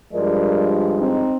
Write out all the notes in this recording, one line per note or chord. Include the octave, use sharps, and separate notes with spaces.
G2 F3 G#3 A#4 D5
C4 D#4